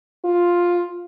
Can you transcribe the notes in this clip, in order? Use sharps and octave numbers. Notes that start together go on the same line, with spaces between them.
F4